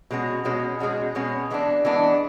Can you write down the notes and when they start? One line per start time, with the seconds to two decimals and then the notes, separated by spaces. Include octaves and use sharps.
0.11 B2 G#3 C#4 F#4
0.45 B2 G#3 C#4 F#4
0.80 B2 G#3 C#4 F#4
1.15 B2 G#3 C#4 F#4
1.50 E3 G#3 B3 D4
1.85 E3 G#3 B3 D4